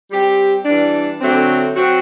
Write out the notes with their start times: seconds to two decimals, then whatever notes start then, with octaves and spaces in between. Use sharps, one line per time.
0.10 G3 C4 G4
0.65 E3 G3 D4
1.20 D3 F#3 A3 C4
1.75 F#3 C4 F#4